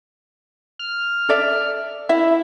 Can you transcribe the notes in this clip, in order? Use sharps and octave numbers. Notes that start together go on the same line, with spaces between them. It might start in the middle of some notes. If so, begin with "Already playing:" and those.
F6
A4 D5 E5
E4 E5